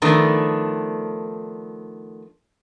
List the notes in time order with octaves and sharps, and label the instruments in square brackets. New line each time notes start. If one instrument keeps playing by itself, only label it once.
[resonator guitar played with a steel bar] D#3 F3 A3 B3 D4